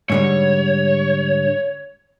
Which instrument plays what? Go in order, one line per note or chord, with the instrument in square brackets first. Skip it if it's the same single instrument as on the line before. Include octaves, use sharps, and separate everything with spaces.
[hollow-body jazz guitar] G#2 D3 G3 [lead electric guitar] C#5